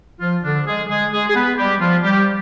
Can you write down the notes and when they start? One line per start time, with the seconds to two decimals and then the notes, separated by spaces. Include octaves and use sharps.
0.20 F3 F4
0.43 D3 D4
0.66 G#3 G#4
0.89 G#3 G#4
1.12 G#3 G#4
1.28 G#4
1.35 B3 B4
1.57 G3 G4
1.80 F3 F4
2.03 G3 G4